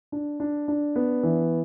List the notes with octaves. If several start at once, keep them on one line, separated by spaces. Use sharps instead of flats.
D4
D4
D4
B3
E3